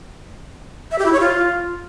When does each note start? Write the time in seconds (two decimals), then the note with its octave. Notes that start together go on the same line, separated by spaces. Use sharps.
0.91 E5
0.98 G4
1.06 E4
1.13 C#5
1.20 F4